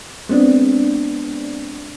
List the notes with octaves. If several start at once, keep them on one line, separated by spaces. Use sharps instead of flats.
G#3 B3 C4 D4